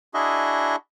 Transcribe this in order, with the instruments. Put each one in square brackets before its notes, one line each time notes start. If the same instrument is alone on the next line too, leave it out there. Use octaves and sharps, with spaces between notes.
[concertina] D4 E4 F#4 G#4 D#5 E5